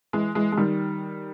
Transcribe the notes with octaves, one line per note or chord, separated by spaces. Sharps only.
E3 G#3
E3 G#3
G#3
D#3 G3